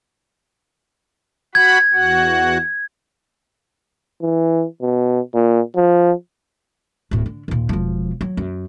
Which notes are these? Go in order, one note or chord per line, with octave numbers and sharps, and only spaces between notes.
F#4 F#5 B5 G#6
E2 F#4 F#5
E3
B2
A#2
F3
D1 A2
D3
D#2 A#2
E1 F3
F#3
F#2